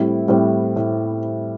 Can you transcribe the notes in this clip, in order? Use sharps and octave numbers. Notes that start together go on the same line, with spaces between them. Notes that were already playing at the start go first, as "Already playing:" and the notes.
Already playing: A2 G3 C4 E4
A2 G3 C4 E4
A2